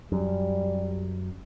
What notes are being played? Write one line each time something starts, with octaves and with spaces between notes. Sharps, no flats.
F#2 G3